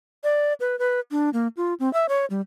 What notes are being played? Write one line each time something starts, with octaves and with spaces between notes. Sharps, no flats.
D5
B4
B4
D4
A#3
F4
C4
E5
C#5
G3